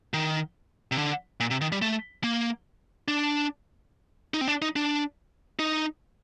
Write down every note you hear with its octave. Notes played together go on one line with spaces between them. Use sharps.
D#3
C3
D3
A#2
C3
D#3
G3
A3
A#3
D4
D#4
C4
D4
D#4
D4
D#4